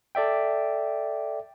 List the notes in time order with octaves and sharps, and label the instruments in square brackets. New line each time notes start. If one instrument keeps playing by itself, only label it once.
[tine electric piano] A4 D5 E5 G5